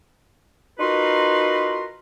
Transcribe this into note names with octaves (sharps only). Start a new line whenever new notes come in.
D#4 F4 F#4 A#4 B4 C6